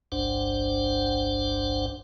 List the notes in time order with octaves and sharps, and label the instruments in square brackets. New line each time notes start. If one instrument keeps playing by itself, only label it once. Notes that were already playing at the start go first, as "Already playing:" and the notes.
[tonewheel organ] G1 C2 G2 D4 C5 F#5